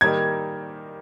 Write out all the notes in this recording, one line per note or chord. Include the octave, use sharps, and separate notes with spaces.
D#3 G3 A#3 D#4 G4 G#6